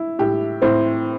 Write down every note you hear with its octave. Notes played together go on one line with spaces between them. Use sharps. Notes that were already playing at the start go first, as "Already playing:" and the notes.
Already playing: E4
A2 G4
A2 C4 C5